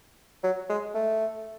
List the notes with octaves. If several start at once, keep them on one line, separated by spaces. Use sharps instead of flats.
F#3
G#3
A3